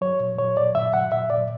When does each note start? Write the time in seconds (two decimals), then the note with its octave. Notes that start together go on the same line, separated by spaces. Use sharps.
0.01 F#3 C#5
0.20 A#2
0.38 F#3 C#5
0.57 A#2 D5
0.75 F#3 E5
0.93 F#3 F#5
1.12 A#2 E5
1.30 A#2 D5